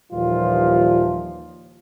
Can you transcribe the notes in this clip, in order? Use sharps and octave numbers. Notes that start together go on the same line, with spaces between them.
D#2 A#2 E3 F3 G3 F4